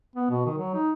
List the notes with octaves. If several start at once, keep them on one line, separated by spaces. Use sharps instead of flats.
B3
B2
D#3
F#3
D#4